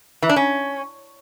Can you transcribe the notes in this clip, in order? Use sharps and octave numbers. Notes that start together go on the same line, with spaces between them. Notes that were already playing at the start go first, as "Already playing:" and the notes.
E3
D4
C#4